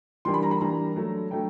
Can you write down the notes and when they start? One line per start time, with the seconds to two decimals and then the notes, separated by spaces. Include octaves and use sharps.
0.25 E3 G3 A#3 D4 C6
0.34 B5
0.43 A#5
0.51 B5
0.61 E3 G3 A#3 D4 A#5
0.96 F#3 A3 D4
1.31 F#3 A3 D4 G5